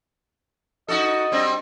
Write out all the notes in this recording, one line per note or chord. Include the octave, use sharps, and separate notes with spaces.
D#4 F#4 A4 D#5
G3 C4 D4